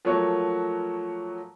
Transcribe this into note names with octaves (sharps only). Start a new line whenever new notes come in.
F3 F#3 A3 A#3 F#4 C#5